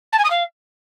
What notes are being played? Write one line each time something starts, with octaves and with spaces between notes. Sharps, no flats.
A5
G#5
D#6
F5